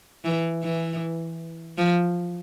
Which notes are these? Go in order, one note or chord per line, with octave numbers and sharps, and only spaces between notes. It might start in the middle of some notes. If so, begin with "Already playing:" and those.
E3
E3
F3